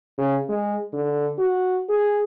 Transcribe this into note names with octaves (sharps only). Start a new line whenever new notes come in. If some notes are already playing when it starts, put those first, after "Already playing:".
C#3
G#3
D3
F#4
G#4